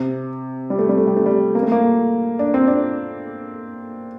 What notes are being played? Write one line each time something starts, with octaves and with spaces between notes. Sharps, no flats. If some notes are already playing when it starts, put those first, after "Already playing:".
Already playing: C3
G3
A3
G3
A3
G3
A3
G3
A#3
A3
A#3
D4
C4
D4